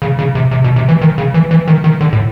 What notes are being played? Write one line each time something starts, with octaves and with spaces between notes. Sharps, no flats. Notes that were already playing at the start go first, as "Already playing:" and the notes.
C#3
C#3
C3
C3
B2
C3
E3
D#3
C#3
E3
E3
D#3
D#3
D3
A2